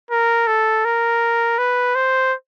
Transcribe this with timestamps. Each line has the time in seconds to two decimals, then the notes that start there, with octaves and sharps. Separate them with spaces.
0.11 A#4
0.47 A4
0.85 A#4
1.58 B4
1.95 C5